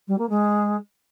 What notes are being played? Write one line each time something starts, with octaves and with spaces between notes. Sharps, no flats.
G3
A#3
G#3